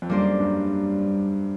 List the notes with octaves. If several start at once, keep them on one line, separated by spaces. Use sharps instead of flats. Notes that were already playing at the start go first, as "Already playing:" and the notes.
F2
F#2 G3 A#3 D4 G4 C5
G2